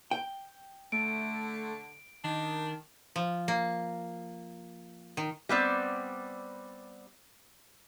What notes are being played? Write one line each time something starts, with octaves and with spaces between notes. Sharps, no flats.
G5
D3 A3 D7
D#3 D4
F3
A#3
D#3
G3 B3 C4 D5